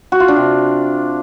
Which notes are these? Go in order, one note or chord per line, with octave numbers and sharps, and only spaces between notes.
F#4
F4
D4
C3